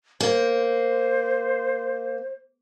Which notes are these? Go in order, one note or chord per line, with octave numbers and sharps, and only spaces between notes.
A#3 C5